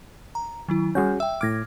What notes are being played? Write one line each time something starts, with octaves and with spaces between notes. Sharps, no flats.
A#5
D#3 F#3 E4
G3 C#4 F#4 G#4 G6
E5 G5 E6
A2 D6 F6 G#6 A#6